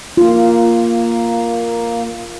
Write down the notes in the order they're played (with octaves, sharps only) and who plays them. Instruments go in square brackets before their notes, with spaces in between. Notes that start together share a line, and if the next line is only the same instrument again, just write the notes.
[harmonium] A#3 [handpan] F4